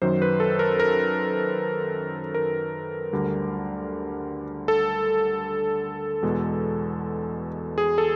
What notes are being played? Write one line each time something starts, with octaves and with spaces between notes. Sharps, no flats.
F#2 D#3 F#3 C5
B4
A4
A#4
A#4
A#4
D2 D3 G3
A4
E2 B2 G#3
G#4
A4